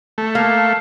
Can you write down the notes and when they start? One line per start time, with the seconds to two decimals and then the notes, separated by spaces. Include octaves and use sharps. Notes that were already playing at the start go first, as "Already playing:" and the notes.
0.18 A3
0.35 A#3 F5